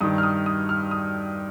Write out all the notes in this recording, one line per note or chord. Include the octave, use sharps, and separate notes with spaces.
G2 D#3 D#6
F6
D#6
D#6
F6
D#6